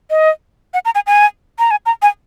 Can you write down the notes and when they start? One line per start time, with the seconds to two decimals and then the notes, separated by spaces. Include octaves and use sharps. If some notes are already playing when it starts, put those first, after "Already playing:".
0.10 D#5
0.74 F#5
0.85 A#5
0.95 G#5
1.07 G#5
1.59 A#5
1.71 G#5
1.86 A#5
2.02 G#5